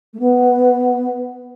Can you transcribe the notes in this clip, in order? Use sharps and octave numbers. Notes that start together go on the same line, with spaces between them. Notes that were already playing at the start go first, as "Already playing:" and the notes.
A3
B3